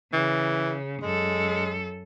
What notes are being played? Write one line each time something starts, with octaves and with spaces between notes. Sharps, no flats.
C#3 E3
F#2 G#3 A4